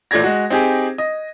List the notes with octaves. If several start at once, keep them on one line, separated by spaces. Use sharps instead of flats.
A1 A#2 A3 D5 G#6 A#6
G#3 F#4
C4 D#4 G4 G#4
D#5